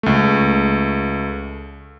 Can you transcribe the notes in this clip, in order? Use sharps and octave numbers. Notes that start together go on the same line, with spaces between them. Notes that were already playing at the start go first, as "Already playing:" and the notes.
C#2 A3